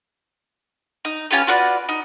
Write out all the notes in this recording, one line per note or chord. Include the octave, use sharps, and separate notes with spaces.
D#4
C#4 F4 G4 B4
F4 F#4 B4 D5
D#4